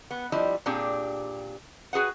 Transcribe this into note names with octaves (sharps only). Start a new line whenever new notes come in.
B3
F3 G3 E4 D#5
A#2 C4 D4 G4 G#4
F#4 G#4 B4 F#5